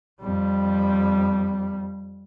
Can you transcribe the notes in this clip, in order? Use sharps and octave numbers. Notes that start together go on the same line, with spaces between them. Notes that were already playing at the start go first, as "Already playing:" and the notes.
F2 G3